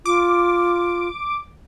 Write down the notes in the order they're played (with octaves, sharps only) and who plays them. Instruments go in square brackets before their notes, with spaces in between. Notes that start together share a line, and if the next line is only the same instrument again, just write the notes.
[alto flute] F4 [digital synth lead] D6